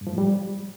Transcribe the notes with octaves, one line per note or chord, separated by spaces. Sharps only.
G2
F3
A2
G3